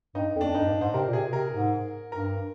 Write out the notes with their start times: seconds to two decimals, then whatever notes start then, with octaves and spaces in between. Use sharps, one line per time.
0.15 G2 D#4
0.35 F2
0.41 D4
0.49 F2
0.55 G2 D#4
0.67 G2
0.81 G#2 C5
0.94 C3 A#4
1.08 A#2
1.13 C3 G#4
1.33 C3 A#4
1.53 G#2
2.12 G2 A#4